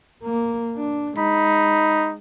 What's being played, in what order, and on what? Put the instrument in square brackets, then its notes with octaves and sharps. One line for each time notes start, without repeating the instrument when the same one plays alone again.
[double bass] A#3
D4
[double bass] G#3 [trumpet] D#4 [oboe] B5